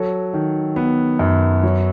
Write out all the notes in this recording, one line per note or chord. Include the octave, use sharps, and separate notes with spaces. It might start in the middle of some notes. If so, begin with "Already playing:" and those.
Already playing: F#3 A4
D#3
B3
F#2
F#3